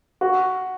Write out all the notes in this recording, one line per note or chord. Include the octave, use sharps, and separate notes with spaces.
F#4